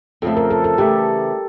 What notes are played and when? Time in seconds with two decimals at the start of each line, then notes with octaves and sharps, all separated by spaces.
0.22 F2 C#3 F3 A3 A4
0.37 A#4
0.51 A4
0.64 A4
0.78 C#3 E3 A3 G4